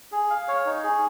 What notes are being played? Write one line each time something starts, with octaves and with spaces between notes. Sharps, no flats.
G#4
F5
C#5
D#4
G#4